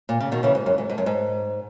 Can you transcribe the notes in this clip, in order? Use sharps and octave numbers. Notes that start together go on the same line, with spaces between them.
A#2
C#3
B2 D#3
C#3 E3
G#2
F#2
G#2
G#2
F#2
G#2